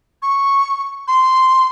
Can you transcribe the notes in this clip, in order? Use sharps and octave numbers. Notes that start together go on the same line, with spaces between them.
C#6
C6